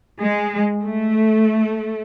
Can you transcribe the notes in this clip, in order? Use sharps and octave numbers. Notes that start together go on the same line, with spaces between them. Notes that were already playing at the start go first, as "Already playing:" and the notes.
G#3
A3